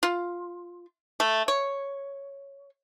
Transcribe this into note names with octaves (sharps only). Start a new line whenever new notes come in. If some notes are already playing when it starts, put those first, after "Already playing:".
F4
A3
C#5